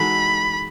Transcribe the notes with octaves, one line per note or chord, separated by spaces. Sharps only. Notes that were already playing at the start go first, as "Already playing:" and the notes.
Already playing: E3 G#3 D#4 F#4 A4 B5